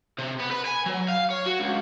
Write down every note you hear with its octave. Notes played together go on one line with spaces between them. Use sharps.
C3
B3
B4
G#5
F#3
F5
C#5
F#4
C#2